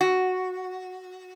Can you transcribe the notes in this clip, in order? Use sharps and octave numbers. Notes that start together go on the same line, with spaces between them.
F#4